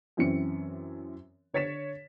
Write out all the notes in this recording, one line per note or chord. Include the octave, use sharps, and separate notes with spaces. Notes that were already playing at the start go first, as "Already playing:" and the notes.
F#2 E3 C4 C#4 C#7
D3 C#5 A6 B6 E7